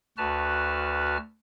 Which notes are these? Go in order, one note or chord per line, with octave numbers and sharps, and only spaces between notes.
D2 F#4 B4 A5 F6